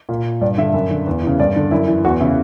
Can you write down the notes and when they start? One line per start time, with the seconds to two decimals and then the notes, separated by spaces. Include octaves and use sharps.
0.09 A#2
0.41 G2 D5
0.58 D3 E5
0.74 F#2
0.91 D3
1.07 E2
1.23 C#3 E3
1.40 G2 D5
1.56 D3
1.71 F#2 E4
1.87 E3
2.05 E2 F#4
2.20 C#3 E3 E4